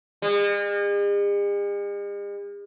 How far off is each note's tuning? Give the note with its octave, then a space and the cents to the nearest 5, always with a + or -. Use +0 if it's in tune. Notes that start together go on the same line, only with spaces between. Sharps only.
G#3 -45